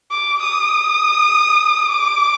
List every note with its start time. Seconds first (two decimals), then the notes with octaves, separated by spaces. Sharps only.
0.11 D6
0.41 D#6
1.90 D6